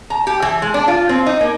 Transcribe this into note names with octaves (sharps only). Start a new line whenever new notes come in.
A#5
G4
E3
G#3
D4
F4
C4
D#4
A#3